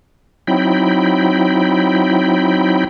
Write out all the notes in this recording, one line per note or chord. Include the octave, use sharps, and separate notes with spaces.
F#3 C4 D#4 E4 G5 B5